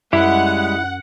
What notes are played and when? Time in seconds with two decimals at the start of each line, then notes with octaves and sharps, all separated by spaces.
0.13 F#2 G3 G#3 E4 F#5